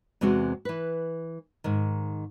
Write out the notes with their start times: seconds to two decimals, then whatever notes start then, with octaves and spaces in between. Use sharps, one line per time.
0.21 E2 C3 G#3 C4 F#4
0.65 E3 B4
1.64 G#2 D#3